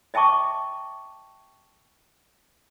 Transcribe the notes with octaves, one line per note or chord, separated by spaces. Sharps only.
D#5 E5 G5 A5 C#6 D6